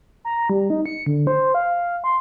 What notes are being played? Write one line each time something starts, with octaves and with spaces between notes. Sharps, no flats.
A#5
G3
D#4
C#7
D3
C5
F5
C6